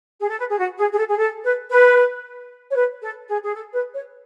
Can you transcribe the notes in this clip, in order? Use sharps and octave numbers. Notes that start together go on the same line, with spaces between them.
G#4
A4
B4
G#4
F#4
G#4
G#4
A4
G#4
A4
B4
B4
C#5
B4
A4
G#4
G#4
A4
B4
C#5